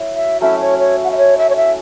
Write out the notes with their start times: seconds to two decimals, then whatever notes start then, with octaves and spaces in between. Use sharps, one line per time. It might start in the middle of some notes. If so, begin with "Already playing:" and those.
Already playing: F#3 E4
0.15 E5
0.41 F#3 A3 C#4 E4 E5
0.61 C#5
0.79 C#5
1.04 F#5
1.11 E5
1.18 C#5
1.38 E5
1.50 C#5
1.56 E5